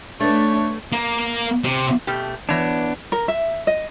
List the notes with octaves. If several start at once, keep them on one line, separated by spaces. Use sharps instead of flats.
A3 B3 D4 C#5
A#3
C3
B2 A3 G4
E3 B3 D4 C#5
A#4
E5
D#5